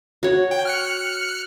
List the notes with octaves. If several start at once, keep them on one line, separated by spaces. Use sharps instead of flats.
F#4 C#5
G5
F6 F#6 C#7